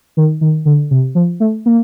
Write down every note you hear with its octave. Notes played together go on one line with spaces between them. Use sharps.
D#3
D#3
D3
C3
F3
A3
A#3